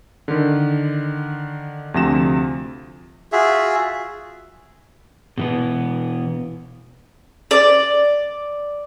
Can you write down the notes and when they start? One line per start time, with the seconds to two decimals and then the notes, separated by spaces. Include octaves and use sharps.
0.28 D3 D#3
1.94 D2 C3 F3 A#6 E7
3.32 F4 F#4 G#4 E5
5.38 B2 E3 B3
7.51 D5